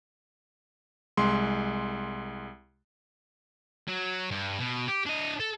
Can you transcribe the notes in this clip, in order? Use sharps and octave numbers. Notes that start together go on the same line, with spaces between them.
C2 G#3 C6
F#3
G2
B2
G4
D4 D#5
A4